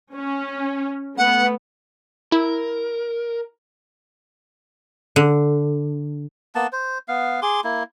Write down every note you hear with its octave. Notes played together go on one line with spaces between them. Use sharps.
C#4
A3 B3 F#5
E4 A#4
D3
A#3 B3 A5
C5
B3 F5
G#4 C6 D6
A#3 E4